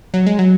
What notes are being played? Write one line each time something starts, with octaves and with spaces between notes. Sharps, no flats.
F#3
G#3
F#3